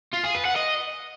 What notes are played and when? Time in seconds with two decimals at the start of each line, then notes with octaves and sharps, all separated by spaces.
0.14 F4
0.24 G#4
0.35 B4
0.45 F#5
0.56 D#5